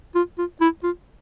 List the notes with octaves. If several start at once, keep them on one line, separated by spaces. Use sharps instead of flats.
F4
F4
E4
F4